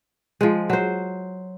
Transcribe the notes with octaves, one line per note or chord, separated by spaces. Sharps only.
F3 G#3
F#3 C5